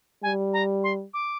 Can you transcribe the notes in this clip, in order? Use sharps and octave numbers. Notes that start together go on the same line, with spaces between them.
G3 G#5
A#5
C6
D6